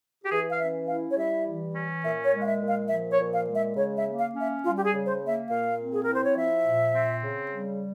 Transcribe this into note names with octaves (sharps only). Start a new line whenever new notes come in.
G4
E3 G#4
F5
C#4 E5
E4 F5
C#5
G3 E5
E3
C#4
A#2 E5
C#5
G#3
F5
E5
A#2
F5
F3 E5
C#5
A#2
F5
G#3
E5
C#3 C#5
E5
A#3
F5
C#4
E5
G3 F4
G4
G#4
C#3
C5
A#3
E5
A#2 F5
C4
G#4
E4 A#4
C5
C#5
F3 E5
A#2
C4
C#3
G3